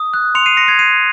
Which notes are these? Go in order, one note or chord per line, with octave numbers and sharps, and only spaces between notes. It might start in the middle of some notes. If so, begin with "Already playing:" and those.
Already playing: D#6
F#6
C6 C#7 F7
C7 D#7
C6 A#6 C#7
G#6 C7
F#6 C7 D#7